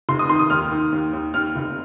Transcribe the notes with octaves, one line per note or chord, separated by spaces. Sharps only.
F1 C6
D#6
D#3 C6
D#6
D#2 F6
D#3
D#2
D#2
D#2 F6
F1